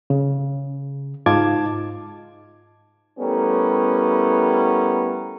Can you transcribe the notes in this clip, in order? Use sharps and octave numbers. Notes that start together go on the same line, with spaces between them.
C#3
G#2 D#4 F4 A5 D6 G#6
G3 A3 B3 C#4 E4 A#4